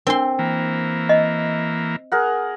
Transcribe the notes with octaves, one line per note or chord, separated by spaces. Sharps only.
C4 D4 A#4 C6
E3 A#3
D#5
G#4 A#4 F#5